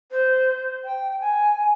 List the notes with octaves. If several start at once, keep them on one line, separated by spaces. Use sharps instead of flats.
C5
G5
G#5